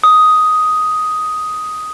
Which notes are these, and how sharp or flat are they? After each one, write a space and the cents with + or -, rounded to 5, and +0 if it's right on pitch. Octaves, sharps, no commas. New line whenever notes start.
D#6 +5